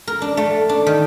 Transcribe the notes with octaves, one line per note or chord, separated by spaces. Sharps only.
A#4
D4
A3
D4
D#3